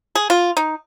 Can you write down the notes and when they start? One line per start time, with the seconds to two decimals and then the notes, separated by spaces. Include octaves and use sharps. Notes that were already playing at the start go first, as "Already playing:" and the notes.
0.15 G#4
0.30 F4
0.57 D#4